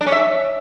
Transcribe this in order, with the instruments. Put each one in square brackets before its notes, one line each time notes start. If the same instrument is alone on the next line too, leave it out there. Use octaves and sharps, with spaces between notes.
[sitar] D4
C#4
E5